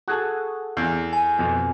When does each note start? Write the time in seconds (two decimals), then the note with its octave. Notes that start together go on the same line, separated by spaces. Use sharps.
0.08 F#4 G#4 A4
0.77 E2
1.13 G#5
1.38 F2 B2